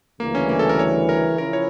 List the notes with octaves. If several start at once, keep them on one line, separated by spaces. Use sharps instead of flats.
D2 C#3 E3 G3 A#3
C#4
A#3
A4
A#4
C#5
A#4
C#3 F3 C#4 E4 A#4
C#5